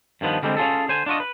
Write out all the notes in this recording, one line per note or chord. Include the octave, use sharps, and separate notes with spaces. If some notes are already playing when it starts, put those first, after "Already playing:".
G2 D#3 F3 B3
D3 G3 G#3 A#3 C4
C#4 F4 G#4 A4
D3 C5 G#5
D4 F4 F#4 D#5
B4